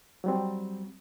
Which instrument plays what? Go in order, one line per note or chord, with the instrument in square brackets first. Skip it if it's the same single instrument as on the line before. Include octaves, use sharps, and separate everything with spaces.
[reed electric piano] F#3 G3 C4